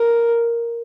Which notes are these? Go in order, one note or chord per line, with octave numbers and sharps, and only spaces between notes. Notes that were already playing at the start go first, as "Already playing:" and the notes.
Already playing: A#4